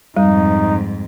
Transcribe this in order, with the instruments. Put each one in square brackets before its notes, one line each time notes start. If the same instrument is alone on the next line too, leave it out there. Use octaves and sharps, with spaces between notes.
[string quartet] F2 G#2 [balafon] G3 [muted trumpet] D#4